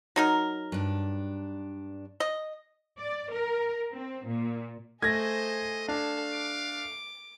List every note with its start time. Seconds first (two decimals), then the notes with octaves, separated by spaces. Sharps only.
0.16 F#3 D#4 A#4
0.72 G2 D4
2.20 D#5
2.99 D5
3.33 A#4
3.94 C4
4.25 A#2
5.02 A3 G#4 C5 D#5 G#6 A#6
5.88 D4 A4 F5
6.32 D6